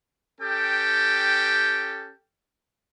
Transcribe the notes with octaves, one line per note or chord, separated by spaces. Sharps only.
C#4 G4 A4 G5